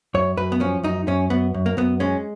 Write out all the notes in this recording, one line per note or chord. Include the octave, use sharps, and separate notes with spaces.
F#2 C#5
F#2 B4
B3
F3 C#4
F#2 D#4
F#2 C#4
F#2 B3
F#2
A#3
F#2 B3
G#3 C#4